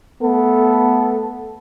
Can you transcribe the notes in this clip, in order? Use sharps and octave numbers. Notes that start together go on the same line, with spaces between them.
A3 B3 A4